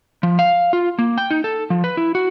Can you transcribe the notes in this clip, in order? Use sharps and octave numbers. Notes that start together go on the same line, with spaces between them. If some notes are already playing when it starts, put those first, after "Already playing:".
F3
F5
F4
A#3
G5
D#4
A4
F3
B4
E4
F#4